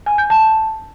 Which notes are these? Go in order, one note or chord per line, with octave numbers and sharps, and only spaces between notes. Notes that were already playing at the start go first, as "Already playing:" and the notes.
G#5
G6
A5